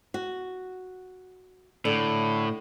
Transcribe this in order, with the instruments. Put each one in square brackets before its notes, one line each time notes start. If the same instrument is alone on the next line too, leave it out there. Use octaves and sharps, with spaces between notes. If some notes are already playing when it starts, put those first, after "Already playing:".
[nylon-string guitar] F#4
[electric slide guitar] A2 [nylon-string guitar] D3